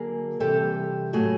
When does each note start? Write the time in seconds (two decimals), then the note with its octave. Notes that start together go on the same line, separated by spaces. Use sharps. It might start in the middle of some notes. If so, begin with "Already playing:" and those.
Already playing: D3 F#3 A#3 G#4 A#4
0.40 C3 E3 G3 G4 A4
1.13 A2 F#3 A3 F#4 G#4